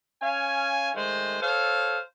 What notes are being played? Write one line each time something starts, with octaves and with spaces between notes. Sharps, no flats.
C#4 F5 G#5
D#3 G#3 A3 C5
A4 C5 C#5 F5